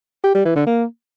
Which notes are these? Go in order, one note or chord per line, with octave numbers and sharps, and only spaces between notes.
G4
G3
E3
D3
A#3